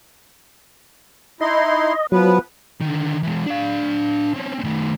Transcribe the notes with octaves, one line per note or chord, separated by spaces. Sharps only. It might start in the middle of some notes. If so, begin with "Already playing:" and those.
D#4 E4 D#5 C6
F3 F#3 B3 B4
D3 D#3
E3 G#3
D4 F5
C4 C#4
D#3 A3